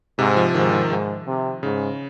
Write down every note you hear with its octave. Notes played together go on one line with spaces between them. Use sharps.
G#2 C3
F3
G#2 D#3
D#3
G#2
C3
G#2 C#3